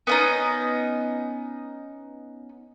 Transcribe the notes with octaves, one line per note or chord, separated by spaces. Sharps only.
B3 C#4 D#4